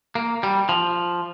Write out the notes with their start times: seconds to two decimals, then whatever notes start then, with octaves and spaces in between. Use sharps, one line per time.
0.15 A#3
0.43 G3
0.69 F3